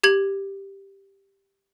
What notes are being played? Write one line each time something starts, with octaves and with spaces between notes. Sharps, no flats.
G4 G#6 F#7